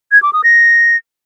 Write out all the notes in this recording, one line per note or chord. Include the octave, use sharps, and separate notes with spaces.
G#6
D6
D#6
A#6